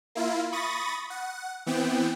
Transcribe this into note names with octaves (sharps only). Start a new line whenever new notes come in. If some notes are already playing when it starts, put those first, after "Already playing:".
A#3 E4 F4
B5 C#6 D#6 A6 A#6
F#5
E3 B3 C4 G5